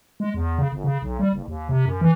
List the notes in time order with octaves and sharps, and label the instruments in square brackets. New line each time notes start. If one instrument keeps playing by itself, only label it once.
[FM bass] G#3
E2
C#3
G1
C#3
B1
G3
F#1
D#2
C3
F#2
E3